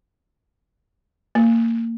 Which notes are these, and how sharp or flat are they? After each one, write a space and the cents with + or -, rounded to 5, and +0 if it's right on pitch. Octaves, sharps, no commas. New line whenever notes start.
A#3 -25